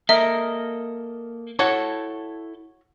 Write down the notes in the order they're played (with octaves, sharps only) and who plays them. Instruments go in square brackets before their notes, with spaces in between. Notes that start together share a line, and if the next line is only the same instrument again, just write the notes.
[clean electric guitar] A#3 A4 D#5 [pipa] A#4 [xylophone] E5
[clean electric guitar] E4 A4 A5 [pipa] F#4 C#5